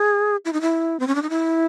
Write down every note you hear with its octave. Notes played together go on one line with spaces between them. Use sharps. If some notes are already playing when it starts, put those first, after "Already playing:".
Already playing: G#4
E4
D#4
E4
C4
C#4
D4
D#4
E4